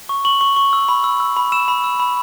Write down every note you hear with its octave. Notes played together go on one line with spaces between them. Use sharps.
C#6
C#6 F#7
C#6
C#6
E6
B5
E6
E6
B5
E6 E7
B5
E6
B5